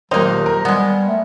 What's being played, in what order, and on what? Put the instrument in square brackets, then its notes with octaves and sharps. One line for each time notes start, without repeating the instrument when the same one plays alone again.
[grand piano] D#1 A#4 C5 [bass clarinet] F#3 [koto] A#3 D#4
[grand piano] A#4
[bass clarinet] G3 [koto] G#3 B3
[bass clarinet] A3